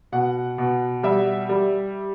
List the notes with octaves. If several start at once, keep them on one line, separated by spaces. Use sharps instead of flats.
B2 F#5
B2
G3 E5
G3